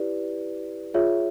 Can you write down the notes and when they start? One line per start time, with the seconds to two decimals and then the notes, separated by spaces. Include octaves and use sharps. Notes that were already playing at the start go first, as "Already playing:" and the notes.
Already playing: E4 G4 B4 D5
0.94 F4 G#4 C#5 E5